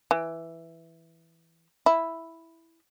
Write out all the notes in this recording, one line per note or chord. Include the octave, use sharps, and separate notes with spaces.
E3
E4